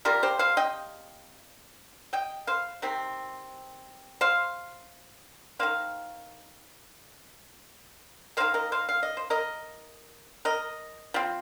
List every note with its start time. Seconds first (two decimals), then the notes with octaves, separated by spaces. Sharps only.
0.05 C3 G3 A#3 F4 A#4
0.23 G4 C5
0.39 C5 F5
0.57 D#5 G5
2.13 D#5 G5
2.47 C5 F5
2.82 C3 D#3 C4
4.21 C5 F5
5.59 D#3 A#3 C5 F5
8.37 D#3 A#3 C5 F5
8.54 A#4 D#5
8.72 C5 F5
8.89 F5
9.03 D#5
9.17 C5
9.30 A#4 D#5
10.45 A#4 D#5
11.14 F3 C4